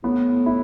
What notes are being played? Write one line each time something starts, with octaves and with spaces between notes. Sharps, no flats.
A2 B3
E4